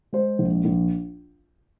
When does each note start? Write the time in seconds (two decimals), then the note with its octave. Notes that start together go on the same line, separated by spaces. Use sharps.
0.12 G#3 C5
0.39 A#1
0.65 A#1